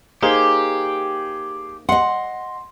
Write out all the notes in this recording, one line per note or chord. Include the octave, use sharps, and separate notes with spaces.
A#3 D#4 G4 G#4 C5
D#5 F#5 C6